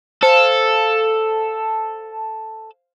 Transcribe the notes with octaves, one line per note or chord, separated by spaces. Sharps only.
A4 C5 F5 G#5